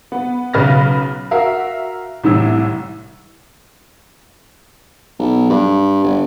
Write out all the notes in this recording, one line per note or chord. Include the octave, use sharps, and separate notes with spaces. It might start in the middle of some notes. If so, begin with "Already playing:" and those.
B3
B1 C#3 B4 F6 A6 A#6
F#4 A#4 E5 F5
C2 A2 E3 E6
B1
G2
G1